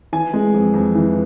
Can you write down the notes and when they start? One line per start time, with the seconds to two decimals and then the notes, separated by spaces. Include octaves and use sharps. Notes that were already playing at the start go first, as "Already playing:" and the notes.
0.13 E3 G#5
0.34 G#3
0.54 F2
0.74 F2
0.95 E3